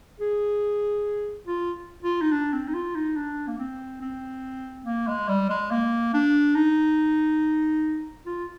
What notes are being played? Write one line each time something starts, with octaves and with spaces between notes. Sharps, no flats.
G#4
F4
F4
D#4
D4
C4
D#4
F4
D#4
D4
A#3
C4
C4
A#3
G#3
G3
G#3
A#3
D4
D#4
F4